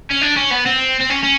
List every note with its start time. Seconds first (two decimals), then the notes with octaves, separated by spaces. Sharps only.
0.11 C#4
0.22 D4
0.37 C#4
0.51 B3
0.66 C4
1.00 C4
1.10 C#4
1.23 C#4